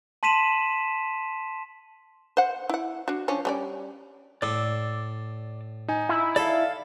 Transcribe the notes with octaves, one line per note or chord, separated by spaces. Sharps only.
A5 C6 B6 D#7 E7 F#7
C5 F#5
E4 F#5
D4 F#4
F3 C#4 D4
G3 C#4 D5
A2 D5 D6 E6
D#4 G#5
E4
A4 D5 F5